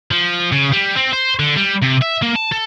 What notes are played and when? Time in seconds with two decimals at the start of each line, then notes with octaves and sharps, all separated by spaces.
0.11 F3
0.52 C#3
0.72 G3
0.96 C4
1.13 C5
1.40 D3
1.57 G3
1.83 C3
2.02 E5
2.22 A#3
2.36 A5
2.52 A4